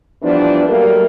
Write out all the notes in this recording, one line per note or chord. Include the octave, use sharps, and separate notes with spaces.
E3 F3 G3 B3 D4
D#3 F#3 G3 A3 A#3